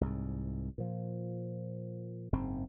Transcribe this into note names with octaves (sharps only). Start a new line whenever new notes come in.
C2 G#2
A#2 F3
F#1 G#2 C4